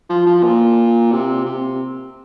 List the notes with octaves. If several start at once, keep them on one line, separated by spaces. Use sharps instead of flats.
F3
F3
A#2
C3
C3